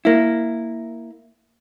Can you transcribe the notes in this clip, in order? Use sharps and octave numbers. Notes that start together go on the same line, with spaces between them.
A#3 E4